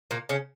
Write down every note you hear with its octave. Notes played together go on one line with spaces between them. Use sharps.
A#2 A#3
C#3 C#4